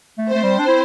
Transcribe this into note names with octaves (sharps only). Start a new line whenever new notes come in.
A3
A3 C4 C5
G3
D4
E4